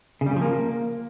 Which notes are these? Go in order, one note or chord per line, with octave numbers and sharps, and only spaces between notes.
C#3
G3
C#3
F3
A#3